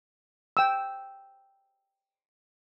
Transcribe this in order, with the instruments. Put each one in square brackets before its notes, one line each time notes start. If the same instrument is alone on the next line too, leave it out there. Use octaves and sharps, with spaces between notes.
[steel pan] G5 E6